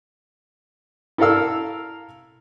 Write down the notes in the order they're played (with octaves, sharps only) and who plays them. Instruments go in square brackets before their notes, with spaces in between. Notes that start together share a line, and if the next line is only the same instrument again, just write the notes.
[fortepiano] E4 A4 A#4 F5 E6